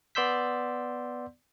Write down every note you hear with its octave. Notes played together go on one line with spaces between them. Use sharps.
B3 D5 C6 E6 G6 B6